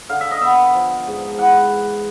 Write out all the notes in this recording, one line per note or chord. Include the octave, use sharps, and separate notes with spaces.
D3 F5
E5
D#5
B3 E5
F3
G#2
E3 F#5